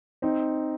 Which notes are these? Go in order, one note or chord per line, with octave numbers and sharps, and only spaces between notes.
C4 D#4